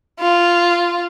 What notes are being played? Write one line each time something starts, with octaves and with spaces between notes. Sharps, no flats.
F4